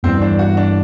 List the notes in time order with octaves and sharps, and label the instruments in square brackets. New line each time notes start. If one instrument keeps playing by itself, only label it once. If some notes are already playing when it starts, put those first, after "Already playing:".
[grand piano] G1 G2 E3 [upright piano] C4
[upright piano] D4
F#4
D4